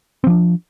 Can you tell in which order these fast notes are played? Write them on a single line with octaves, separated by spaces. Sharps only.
C4 F3 D4